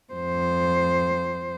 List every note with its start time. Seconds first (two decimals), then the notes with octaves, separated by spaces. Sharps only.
0.13 F2 C5